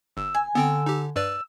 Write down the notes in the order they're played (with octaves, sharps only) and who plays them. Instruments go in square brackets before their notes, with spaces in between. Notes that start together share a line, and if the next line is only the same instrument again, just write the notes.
[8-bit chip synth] G1 [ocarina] E6
[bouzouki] G#5
[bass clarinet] D3 [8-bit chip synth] B3 C4 G5 [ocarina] E6
[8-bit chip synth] D#4 G4
[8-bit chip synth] G2 B4 D5 [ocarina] E6